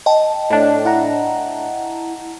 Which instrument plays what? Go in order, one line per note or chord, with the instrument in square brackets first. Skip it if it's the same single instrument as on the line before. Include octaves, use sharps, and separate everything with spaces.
[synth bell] D#5 G5 A5
[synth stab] A2 D4
[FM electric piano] E4 F#5 A#5